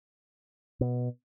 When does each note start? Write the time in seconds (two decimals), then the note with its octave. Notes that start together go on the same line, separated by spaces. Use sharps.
0.81 B2